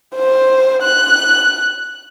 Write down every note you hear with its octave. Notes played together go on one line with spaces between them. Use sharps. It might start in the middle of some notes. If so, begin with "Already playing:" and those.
C5
F#6